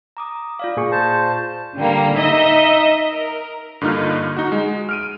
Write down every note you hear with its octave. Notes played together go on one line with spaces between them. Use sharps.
A#5 D6 D#6
F4 D5 F5
A#2 G#4 C#6
C5 A5
D3 G3 A#3
D#4 D#5 E5
A#4
G2 D3 A#3 D#4 F4 F6
D#4 F#4
G#3
F6 D7 D#7